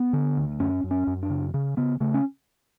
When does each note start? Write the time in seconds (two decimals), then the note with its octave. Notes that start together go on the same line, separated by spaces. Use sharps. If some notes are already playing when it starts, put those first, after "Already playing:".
Already playing: B3
0.13 D3
0.37 D2
0.60 F#2 C#4
0.84 F#2
0.91 C#4
1.07 F#2
1.23 D4
1.30 C#3
1.54 C#3
1.77 C#3 B3
2.00 C#3 A3
2.14 C#4